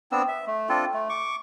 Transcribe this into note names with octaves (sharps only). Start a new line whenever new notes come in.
B3 C4 D4 E6
E5
A3
C4 D4 F4 A4
A3
C#6 D6